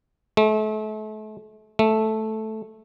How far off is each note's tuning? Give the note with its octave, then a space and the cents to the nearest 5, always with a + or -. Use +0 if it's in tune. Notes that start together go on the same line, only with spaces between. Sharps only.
A3 -35
A3 -5